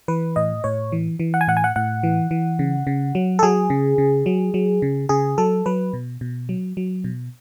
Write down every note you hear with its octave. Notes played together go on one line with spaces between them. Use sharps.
E3 B4
A2 D#5
A2 C#5
E3
E3
F#5
G#5
A2 F#5
G#5
F#5
A2 F#5
E3
E3
C#3
C#3
F#3
A4
F#3 G#4
C#3
C#3
F#3
F#3
C#3
C#3 G#4
F#3 A4
F#3 B4
B2
B2
F#3
F#3
B2